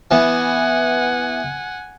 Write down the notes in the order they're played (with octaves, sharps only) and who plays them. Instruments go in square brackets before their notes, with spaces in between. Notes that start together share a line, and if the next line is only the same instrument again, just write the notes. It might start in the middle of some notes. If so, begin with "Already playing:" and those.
[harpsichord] E3 B3 [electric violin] F#5 G#5